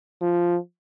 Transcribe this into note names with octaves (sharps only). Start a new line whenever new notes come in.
F3